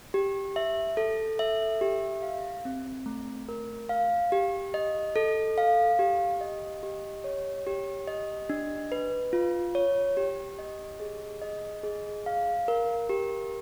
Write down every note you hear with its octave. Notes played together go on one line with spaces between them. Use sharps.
G4
E5
A4
E5
G4
F5
C4
A3
A#4
F5
G4
D#5
A4
F5
G4
D#5
G4
C#5
G4
D#5
D4
B4
F4
C#5
G4
D#5
G#4
D#5
G#4
F5
A#4
G4